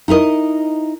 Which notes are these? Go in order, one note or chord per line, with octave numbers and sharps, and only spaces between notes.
D#4 E4 A#4 D#5